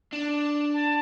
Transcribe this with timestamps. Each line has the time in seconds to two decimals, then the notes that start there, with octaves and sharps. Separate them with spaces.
0.13 D4
0.74 A5